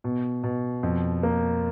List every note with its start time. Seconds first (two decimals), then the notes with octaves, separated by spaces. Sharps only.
0.04 B2
0.43 B2
0.83 F2
1.23 A#3